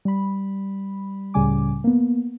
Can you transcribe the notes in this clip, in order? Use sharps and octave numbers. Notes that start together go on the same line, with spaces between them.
G3 B5
C#2 A2 C#3 G3 G#5 D6
A#3 B3